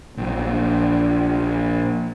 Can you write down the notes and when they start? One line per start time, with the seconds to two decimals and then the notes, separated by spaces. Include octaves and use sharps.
0.17 A#1 F#3